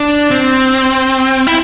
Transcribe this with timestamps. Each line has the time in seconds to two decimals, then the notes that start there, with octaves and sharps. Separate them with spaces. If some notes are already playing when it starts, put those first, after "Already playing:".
Already playing: D4
0.31 C4
1.47 E4